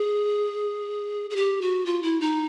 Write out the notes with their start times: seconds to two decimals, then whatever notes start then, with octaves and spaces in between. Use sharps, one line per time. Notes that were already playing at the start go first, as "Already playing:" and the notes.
Already playing: G#4
1.30 G#4
1.36 G4
1.61 F#4
1.86 F4
2.03 E4
2.20 D#4